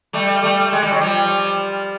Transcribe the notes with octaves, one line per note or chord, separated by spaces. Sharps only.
G3 A3
G3 A3
G#3
G3
F#3
F3 G3